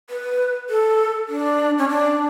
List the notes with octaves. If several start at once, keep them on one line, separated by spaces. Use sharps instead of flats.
B4
A4
D4
C#4
D4